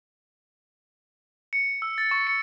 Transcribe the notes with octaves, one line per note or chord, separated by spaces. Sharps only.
C#7
E6
A6
C#6
C#7